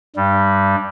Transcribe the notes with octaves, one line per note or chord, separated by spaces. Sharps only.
G2 G3